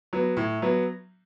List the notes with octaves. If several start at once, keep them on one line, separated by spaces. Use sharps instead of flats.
F#3 B3
A2
F#3 B3